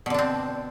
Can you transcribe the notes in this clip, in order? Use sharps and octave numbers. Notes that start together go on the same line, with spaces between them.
B2 D3 C4 D4